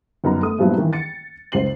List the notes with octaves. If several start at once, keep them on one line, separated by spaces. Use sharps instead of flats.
G1 F#2 B3 D#4 A#5
A3 D#6
G2 A#2 F3 F#3 B3 E4
D#3 E3
A6 C#7
F#1 C#2 C5 C7 F#7